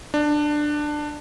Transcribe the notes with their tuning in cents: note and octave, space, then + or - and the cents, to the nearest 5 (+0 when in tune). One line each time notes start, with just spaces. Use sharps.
D4 +15